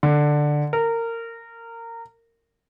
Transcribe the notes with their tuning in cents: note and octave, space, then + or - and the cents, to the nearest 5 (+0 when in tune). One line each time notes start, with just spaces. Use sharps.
D3 +10
A#4 -20